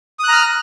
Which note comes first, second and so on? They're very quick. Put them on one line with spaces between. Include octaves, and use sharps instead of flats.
D#6 F#6 A#5 F6